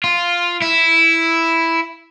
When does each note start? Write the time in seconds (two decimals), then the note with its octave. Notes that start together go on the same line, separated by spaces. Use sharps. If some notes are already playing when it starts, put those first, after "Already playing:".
0.04 F4
0.61 E4